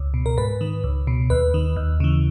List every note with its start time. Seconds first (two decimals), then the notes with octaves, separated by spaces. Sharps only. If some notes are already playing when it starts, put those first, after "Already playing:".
Already playing: C#2
0.14 B2
0.26 A#4
0.37 G#2 B4
0.61 D#3
0.84 C#2
1.07 B2
1.30 D#2 B4
1.54 D#3
1.76 D#2
2.00 C#3 E3